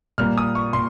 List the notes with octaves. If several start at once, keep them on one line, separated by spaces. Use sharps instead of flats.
A#2 G3 A#3 F6
D#6
C#6
A#2 C6